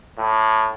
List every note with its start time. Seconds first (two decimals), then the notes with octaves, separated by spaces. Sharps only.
0.18 A2